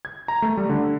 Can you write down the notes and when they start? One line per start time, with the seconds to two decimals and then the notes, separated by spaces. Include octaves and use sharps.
0.05 G#6
0.28 A#5
0.42 A3
0.57 G3
0.69 D3